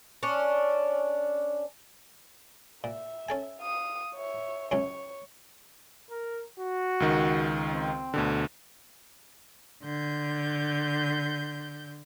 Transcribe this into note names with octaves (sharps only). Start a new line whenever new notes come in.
C#4 D4
A#2 E5
C#4 A4 G#5
F5 D#6
C#5 E5
C#2 F#2 C#4 C#5
A#4
F#4
C#2 D#3
C4
D2 B2 D3
D3 G6